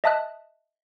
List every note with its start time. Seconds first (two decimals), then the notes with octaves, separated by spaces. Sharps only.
0.04 D#5 E5 A5 D#6 F#6